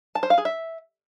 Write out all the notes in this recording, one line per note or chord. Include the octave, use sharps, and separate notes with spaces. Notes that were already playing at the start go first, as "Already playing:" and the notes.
A5
C5
F5
G#4
E5